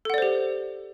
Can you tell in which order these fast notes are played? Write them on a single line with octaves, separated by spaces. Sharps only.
A4 F#5 D5 C5 G4